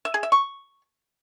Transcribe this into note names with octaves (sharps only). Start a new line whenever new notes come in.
E5
G#4
E5
C#6